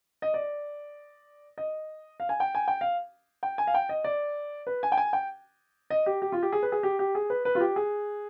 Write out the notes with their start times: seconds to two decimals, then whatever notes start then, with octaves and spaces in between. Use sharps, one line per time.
0.22 D#5
0.34 D5
1.58 D#5
2.20 F5
2.29 G#5
2.40 G5
2.55 G#5
2.68 G5
2.81 F5
3.43 G5
3.58 G#5
3.67 F5
3.74 G5
3.89 D#5
4.04 D5
4.67 B4
4.83 G#5
4.92 G5
4.98 G#5
5.13 G5
5.90 D#5
6.06 G4
6.22 G4
6.32 F4
6.43 G4
6.53 G#4
6.63 B4
6.72 G#4
6.83 G4
6.99 G4
7.15 G#4
7.30 B4
7.45 B4
7.55 F4
7.61 G4
7.76 G#4